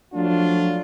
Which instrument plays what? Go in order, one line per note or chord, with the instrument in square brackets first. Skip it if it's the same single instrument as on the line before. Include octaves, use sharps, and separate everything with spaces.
[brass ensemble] F3 F#3 A3 D4 F4